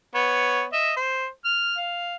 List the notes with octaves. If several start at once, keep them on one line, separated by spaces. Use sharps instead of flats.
B3 C#5
D#5 E5
C5
F6
F5